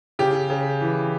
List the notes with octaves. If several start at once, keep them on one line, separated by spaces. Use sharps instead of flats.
C#3 G4
C#3
E3